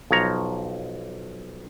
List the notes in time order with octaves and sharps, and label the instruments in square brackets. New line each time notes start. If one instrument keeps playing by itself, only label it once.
[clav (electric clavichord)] B1 F3 C#5 A#5